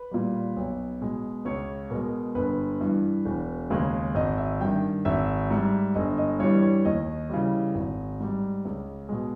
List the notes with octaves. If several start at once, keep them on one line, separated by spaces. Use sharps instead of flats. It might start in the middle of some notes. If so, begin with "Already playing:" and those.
Already playing: B4
A#2 G3
B1
B2 G#3
C#2 C#5
B2 G#3 A#4
G1 B4
G2 E3
E1
D#2 C#3 G#3
G#1 D#5
E5
G2 D#3 G5
G#1 E5
G#2 G3
G1 D#5
D#5
G2 E3 G3 C#5
C#5
D#2 D#5
C#3 E3 G3
G#1
G#2 G3
C#2
B2 G#3